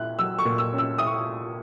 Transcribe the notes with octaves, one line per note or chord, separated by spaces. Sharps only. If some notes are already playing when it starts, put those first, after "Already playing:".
Already playing: A#2 E4 F#6
F#3 E6
C#6
A#2
E6
C#4
E6
E4 D#6
C#6